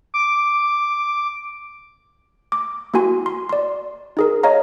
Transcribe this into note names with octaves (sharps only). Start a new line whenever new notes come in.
D6
D6
A#3 E4 F#4 G#5 C6
C6
D5 C6
D#4 G#4 A#4
C#5 D#5 F5 A#5